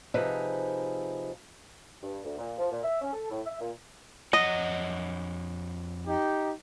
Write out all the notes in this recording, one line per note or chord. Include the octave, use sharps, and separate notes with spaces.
C3 F3 D#4 G#4 B4
G2
D2
A#2
F3
A#2
E5
C#4
A4
A2
E5
A#2
F2 C#5 D#5 F#5
D#4 G4